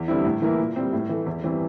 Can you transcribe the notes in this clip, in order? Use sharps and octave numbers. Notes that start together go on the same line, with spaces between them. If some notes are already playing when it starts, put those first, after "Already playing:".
Already playing: E2
D3 G3 C4 E4
A2
E3 A#3 E4
A#2
G3 C4
A2
E3 A3
E2
E3 G3 C4